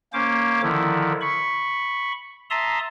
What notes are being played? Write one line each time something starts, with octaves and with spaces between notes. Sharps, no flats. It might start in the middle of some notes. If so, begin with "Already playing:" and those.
A#3 C#4 C5 D6
D3 D#3 F3 E4
B5 C#6
E5 A5 A#5 C6 D#6